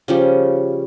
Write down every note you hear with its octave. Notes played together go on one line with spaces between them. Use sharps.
C#3 F3 G3